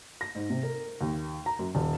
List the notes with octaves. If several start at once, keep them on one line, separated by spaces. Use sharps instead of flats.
A#6
G#2
C3
A#4
D#2
A#5
F#2
D#1